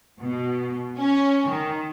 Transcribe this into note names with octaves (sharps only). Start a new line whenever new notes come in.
B2
C#4
D#3